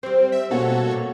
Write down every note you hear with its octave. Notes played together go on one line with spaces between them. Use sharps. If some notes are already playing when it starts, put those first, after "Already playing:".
G3 C4 C5
E5
B2 A#3 F#4 A4 C#5 F#5
A#2